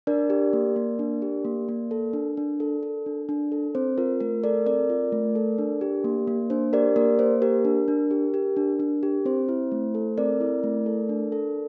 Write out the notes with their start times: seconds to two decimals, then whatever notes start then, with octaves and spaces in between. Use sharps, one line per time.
0.07 D4 A#4 D5
0.30 G4
0.53 A#3
0.76 A#3
0.99 D4
1.22 G4
1.45 A#3
1.68 A#3
1.91 A4
2.13 D4
2.37 D4
2.60 A4
2.83 A4
3.06 D4
3.29 D4
3.52 A4
3.75 C4 C5
3.98 F4 A#4
4.20 A3 A#4
4.44 A4 A#4 D5
4.66 C4 A#4 D5
4.90 F4
5.12 A3
5.35 A4
5.58 D4
5.81 G4
6.04 A#3
6.27 A#3
6.50 D4 C5
6.73 G4 A#4 D5
6.96 A#3 A#4 D5
7.19 A#3 C5
7.42 G4 A#4
7.65 D4
7.88 D4
8.11 G4
8.34 G4
8.57 D4
8.80 D4
9.03 G4
9.25 C4 C5
9.49 E4
9.72 A3
9.95 A4
10.18 C4 A#4 D5
10.41 E4
10.64 A3
10.86 A4
11.09 D4
11.32 A4